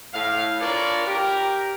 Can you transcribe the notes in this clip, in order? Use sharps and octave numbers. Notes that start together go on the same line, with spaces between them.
A2 F5
D4 F4 A#4 B4 C#5 D5
G4 A#4